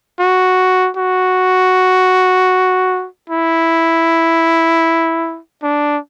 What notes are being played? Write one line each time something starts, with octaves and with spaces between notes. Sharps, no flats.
F#4
F#4
E4
D4